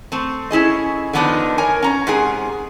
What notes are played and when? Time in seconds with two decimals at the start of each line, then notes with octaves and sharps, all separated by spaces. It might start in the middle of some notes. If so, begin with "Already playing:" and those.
0.12 A3 C4
0.51 C#4 E4 G#4 D#5
1.13 D3 D#3 F3 B3 D4 D#4
1.58 A#4 C#5 G#5
1.82 C#4 A#5
2.07 G#2 C3 G#4